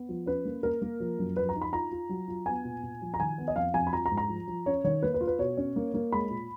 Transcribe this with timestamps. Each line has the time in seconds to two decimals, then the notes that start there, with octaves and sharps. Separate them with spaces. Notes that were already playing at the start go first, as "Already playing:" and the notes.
Already playing: B3
0.09 F3
0.26 C#4 B4
0.45 A#3
0.63 A#3 A#4
0.82 A#3
1.00 F3
1.19 F#2
1.37 F3 B4
1.49 A#5
1.55 D#4
1.61 B5
1.73 F4 A#5
1.91 F4
2.09 F#3
2.28 F4
2.46 B3 G#5
2.65 A#2
2.83 A#2
3.01 F3
3.14 A#5
3.20 D#3 G#5
3.38 B3
3.48 D#5
3.56 F2 F5
3.74 F2 G#5
3.87 B5
3.93 F3 A#5
4.06 A#5
4.11 G#2
4.17 A#5
4.29 F3
4.47 F3
4.66 C#4 C#5
4.84 D#3 C#5
5.02 A#3 B4
5.14 B4
5.21 F4
5.27 B4
5.39 B2 C#5
5.57 C#4
5.76 A#3
5.94 A#3
6.12 G#3 B5
6.30 A#2